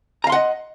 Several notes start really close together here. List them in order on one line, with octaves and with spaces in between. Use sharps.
A#5 F5 C6 F#5 D#5